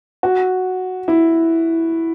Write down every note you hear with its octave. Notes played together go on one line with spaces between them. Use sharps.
F#4
E4